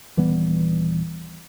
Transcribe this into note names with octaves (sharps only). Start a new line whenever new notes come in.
D#1 E3 G3 B3